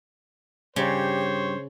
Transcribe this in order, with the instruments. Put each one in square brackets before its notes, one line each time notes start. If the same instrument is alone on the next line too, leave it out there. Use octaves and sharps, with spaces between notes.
[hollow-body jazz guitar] G2 [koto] C#3 [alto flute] G4 [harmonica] C5 C#5